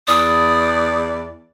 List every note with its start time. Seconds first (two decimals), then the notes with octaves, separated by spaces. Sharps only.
0.08 E2 D5 D#6